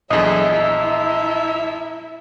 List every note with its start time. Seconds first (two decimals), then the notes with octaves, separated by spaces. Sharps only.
0.11 A#1 E2 F#3 D4 G#4 A4 D#5 E5
0.55 E4 E5 A5 A#5 E6